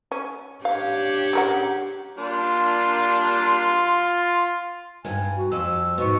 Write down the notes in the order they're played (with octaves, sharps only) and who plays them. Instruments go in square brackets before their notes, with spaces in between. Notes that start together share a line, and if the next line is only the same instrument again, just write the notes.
[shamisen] C#4
[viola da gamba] D4 G4 C#5 [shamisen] F5
[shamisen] C#3 A#4 F#5
[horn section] G3 A#3 D4 [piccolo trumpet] F4 [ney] C6
[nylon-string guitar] D2 G2 [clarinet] G#5
[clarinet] F#4
[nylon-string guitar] F2 [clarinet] E6
[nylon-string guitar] G#2 B2 [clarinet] C#6